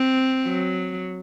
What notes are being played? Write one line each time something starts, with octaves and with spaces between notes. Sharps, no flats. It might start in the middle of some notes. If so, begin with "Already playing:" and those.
Already playing: C4
F#3